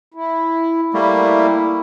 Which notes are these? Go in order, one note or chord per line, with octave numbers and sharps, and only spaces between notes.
E4
G3 A3 A#3 E4